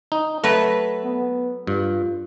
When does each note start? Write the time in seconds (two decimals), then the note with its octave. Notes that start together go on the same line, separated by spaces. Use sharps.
0.12 D#4
0.44 F#3 A3 A4 B4
1.04 B3
1.67 G2 F4